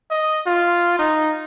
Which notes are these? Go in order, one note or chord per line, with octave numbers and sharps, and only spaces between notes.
D#5
F4
D#4